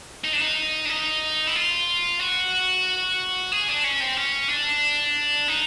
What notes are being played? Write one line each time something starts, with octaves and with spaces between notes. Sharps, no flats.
D#4
D4
D#4
D4
D#4
E4
F4
F#4
G#4
D4
C#4
C4
C#4
D4
D#4